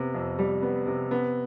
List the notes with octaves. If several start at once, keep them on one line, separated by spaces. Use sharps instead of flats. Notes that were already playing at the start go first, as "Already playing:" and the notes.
Already playing: C3 B3
F2
G3
B3
C3
B3